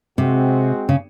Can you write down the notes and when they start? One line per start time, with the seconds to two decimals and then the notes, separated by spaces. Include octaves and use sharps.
0.18 C3 G#3 C4 F#4
0.89 C#3